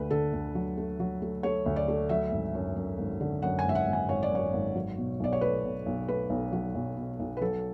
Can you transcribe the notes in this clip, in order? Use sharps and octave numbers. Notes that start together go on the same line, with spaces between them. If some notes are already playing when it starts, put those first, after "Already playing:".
Already playing: D2 D3 B4
D3 A4
D2
F#3
A3
F#3
A3
A3 C#5
D2
D5
A3
F#3 E5
G#1
F#2
F#2
G#1
D3
F#2 F#5
G#5
G#1 E5
F#5
G#1
G#5
G#1 C#5
D5
F#2 C#5
G#1
F#3
B2
B1 D5
C#5
A3 B4
B2
B1
A3 B4
B1
F#3
B1
B2
B1
B4
F#3 A4